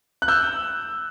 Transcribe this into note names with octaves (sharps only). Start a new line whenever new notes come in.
F#6
E6 G6